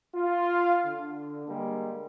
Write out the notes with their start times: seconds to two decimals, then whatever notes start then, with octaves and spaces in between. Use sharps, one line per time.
0.15 F4
0.86 D3
1.48 D3 G3 G#3 A#3